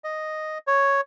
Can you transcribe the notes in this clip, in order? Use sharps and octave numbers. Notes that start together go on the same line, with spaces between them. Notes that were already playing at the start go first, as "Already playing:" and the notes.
D#5
C#5